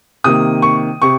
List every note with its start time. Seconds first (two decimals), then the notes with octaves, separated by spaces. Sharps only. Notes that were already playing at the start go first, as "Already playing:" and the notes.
0.24 C3 D#3 A#3 D#6
0.62 C#6
1.02 C3 C#6